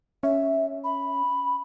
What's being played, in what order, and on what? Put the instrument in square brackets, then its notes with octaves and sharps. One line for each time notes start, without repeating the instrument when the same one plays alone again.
[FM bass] C#4 [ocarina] E5
[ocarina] B5